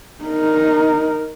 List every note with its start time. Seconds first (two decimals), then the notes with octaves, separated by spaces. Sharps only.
0.24 D#4 A#4